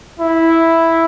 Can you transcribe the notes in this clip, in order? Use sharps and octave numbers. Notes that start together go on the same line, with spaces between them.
E4